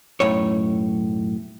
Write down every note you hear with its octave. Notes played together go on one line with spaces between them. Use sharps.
B1 F#2 A2 C#5